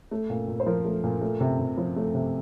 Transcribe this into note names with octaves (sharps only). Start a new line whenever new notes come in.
A3
A#2
A#2
C5
F3 A#4
A3
A#2
A3
C3
C3
F3
A3
C3